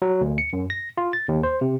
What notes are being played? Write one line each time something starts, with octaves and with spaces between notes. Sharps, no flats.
F#3
D2
C#7
F#2
A#6
F4
A6
D#2
C5
C3